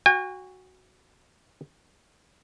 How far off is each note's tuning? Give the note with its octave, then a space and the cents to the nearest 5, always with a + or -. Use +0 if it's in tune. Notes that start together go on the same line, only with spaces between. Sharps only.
F#4 +0 G#5 -40